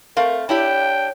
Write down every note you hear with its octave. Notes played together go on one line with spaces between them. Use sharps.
A3 C4 A#4 F5
D4 E4 G4 C#5 G5